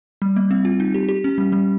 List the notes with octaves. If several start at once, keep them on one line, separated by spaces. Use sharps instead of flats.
G3
A#3
C4
F4
D#4
G4
G4
C#4
G3
G3